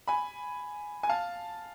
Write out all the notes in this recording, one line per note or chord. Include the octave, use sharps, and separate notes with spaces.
G#5 B5
G#5
F5 A5